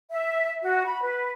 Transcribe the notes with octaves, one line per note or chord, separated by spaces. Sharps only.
E5
F#4
B5
B4